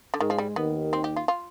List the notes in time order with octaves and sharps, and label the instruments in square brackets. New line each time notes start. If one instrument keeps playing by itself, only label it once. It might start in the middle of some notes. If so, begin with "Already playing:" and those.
[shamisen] D3
[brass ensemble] G#2 G#3 [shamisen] D#3
[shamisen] F3
G3
[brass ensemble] D#2 D#3 [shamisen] B3
[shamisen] C4
G4
F4
F4